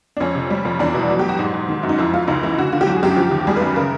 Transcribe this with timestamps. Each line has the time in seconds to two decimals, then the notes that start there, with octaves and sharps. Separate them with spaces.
0.17 D4
0.20 F2 C#4
0.35 C3
0.50 G3
0.65 F2
0.79 E2 D4
0.94 B2 E4
1.10 F#3
1.19 G4
1.24 F#3
1.29 F#4
1.39 G#2
1.54 G#2
1.68 D#3
1.83 F#2
1.89 D#4
1.98 F2 E4
2.13 F2 F4
2.28 C#2 D#4
2.43 E3 E4
2.58 D3 F#4
2.73 D3 F4
2.81 G4
2.87 F#3 F#4
2.96 G#4
3.03 F#2 G4
3.16 F3
3.31 D#2
3.47 G3 G#4
3.56 B4
3.61 F#2
3.76 C#3 A#4